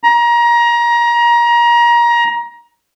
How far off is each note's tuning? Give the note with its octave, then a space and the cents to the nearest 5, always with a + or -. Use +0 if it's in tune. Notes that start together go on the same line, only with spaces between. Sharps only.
A#5 +25